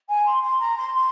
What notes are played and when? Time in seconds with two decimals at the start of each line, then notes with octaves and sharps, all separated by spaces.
0.09 G#5
0.25 C6
0.43 C6
0.60 A#5
0.77 C6
0.94 C6